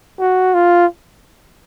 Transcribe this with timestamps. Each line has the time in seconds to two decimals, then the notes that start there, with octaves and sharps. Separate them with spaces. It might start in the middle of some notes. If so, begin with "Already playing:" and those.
0.19 F#4
0.54 F4